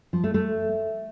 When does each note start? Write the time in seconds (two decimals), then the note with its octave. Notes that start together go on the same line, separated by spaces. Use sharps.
0.13 F3
0.24 A3
0.34 A3